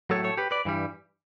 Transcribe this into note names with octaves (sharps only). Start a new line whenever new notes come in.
A2 F#3 A3 A4 C#5
A4 C#5
G4 B4
B4 D5
G2 E3 G3